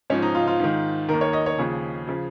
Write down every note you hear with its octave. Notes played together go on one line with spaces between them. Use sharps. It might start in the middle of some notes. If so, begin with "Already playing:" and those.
G#2 F3 C#4
D#4
F4
F4
G#2 D#3
D#3 A#4
D#2
C#5
D#5
C#5
D#2 C#3 F3 G#4
C#3 F3